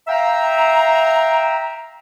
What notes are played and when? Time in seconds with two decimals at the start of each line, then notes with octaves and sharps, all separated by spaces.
0.08 E5 F5 G5 A#5